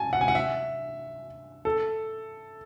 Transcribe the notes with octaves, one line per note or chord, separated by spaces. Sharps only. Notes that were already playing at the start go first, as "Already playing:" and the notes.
Already playing: G#5 A5
F#5
G#5
F#5
E5
A4